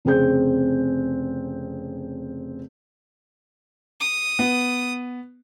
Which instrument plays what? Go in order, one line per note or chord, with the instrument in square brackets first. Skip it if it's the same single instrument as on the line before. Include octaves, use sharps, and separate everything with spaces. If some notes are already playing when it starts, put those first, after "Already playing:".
[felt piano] F1 C#3 C4 G#4 G6
[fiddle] D#6
[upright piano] B3